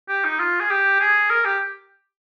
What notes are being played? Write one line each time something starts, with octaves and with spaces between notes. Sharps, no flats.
G4
D#4
F4
G#4
G4
G#4
A#4
G4